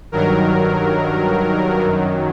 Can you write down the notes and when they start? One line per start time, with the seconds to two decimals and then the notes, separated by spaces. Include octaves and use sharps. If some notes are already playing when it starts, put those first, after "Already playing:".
0.12 G2 D#3 F#3 A#4
1.79 F#2 D#3 F#3